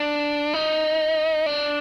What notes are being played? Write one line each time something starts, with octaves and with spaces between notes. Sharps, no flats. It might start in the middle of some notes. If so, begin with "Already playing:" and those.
Already playing: D4
D#4
D4